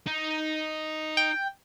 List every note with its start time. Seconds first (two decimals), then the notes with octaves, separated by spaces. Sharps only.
0.06 D#4
1.17 G5